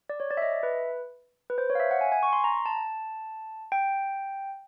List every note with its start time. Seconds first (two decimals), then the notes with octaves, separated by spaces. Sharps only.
0.09 D5
0.20 C#5
0.31 D5
0.37 E5
0.42 D#5
0.53 E5
0.63 B4
1.50 B4
1.58 C5
1.70 C#5
1.75 F5
1.80 E5
1.91 F#5
2.01 G#5
2.12 G#5
2.23 C#6
2.33 C6
2.44 A#5
2.66 A5
3.72 G5